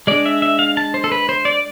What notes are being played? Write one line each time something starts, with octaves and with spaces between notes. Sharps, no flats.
G#3 D4 D5
E5
E5
F5
A5
C5
A4
B4
C5
D5